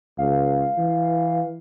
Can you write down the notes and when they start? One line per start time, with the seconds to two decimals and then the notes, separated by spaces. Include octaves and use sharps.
0.18 C#2 F5
0.78 E3